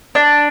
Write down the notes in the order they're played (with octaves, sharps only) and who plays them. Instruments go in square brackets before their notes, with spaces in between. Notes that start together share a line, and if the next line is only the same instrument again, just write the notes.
[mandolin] D4